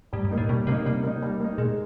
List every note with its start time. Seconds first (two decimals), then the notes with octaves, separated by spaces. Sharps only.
0.13 G#2 G3
0.25 G#2
0.31 A#3 D#4
0.38 A2
0.49 B2 G3
0.67 C3 A#3 D#4
0.86 C3 G3
1.03 A#3 D#4
1.22 G3
1.40 A#3 D#4
1.58 A#2 G#3